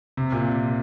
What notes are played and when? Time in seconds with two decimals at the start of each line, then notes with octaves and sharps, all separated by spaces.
0.17 C3
0.32 A#2